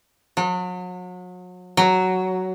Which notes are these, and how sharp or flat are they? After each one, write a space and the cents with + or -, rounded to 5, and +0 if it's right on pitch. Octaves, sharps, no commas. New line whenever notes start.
F#3 -35
F#3 +5